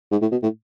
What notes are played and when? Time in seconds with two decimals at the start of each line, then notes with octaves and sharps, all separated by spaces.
0.12 G#2
0.22 A2
0.32 B2
0.43 A2